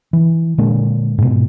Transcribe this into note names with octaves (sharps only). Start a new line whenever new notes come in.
E3
A#2 D3 G#3 A#3
G#2 B2